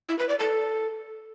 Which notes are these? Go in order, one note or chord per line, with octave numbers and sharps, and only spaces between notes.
E4
B4
D5
A4